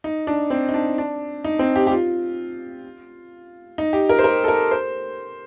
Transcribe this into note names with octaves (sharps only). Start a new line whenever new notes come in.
D#4
D4
C4
D#4
D4
D4
D#4
C4
G4
G4
F4
D#4
G4
A#4
C5
A#4
A4
A#4
C5